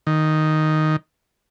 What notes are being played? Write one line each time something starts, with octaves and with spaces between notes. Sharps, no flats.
D#3